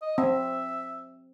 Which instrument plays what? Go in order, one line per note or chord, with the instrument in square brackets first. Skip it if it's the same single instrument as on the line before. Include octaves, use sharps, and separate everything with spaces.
[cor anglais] D#5
[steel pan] C4 [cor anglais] E5